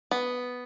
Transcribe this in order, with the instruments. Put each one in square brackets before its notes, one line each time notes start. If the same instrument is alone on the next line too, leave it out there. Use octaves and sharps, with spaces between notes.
[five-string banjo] B3